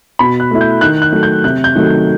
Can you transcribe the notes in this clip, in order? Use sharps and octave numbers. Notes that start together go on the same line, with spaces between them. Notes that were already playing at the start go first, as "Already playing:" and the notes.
B2 B5
F#6
A3 E4
G6
D#3 F#6
F#6
F#3 A3
G6
C3 F#6
G6
D#3 F#3 A3